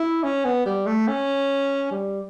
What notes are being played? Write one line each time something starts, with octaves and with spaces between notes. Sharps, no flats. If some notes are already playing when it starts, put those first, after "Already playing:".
Already playing: E4
C#4
B3
G3
A3
C#4
G3